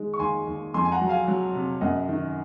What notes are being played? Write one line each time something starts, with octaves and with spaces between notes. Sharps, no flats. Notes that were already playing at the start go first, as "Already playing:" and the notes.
Already playing: D#3 G#3
C#6
D#2 G#5 C6
D#2
F2 G#5 C6
G#5
F#5 A#5
F#3
F5 G#5
F#3
C3
F#2 D#5 F#5
D#3